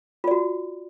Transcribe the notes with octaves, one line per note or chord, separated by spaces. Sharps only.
F4 F#4 D5